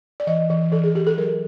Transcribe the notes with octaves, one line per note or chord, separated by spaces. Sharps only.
D5
E3 D#5
E3 D#5
E3 A4
G#4
E3 G4
A4
F#3 A#4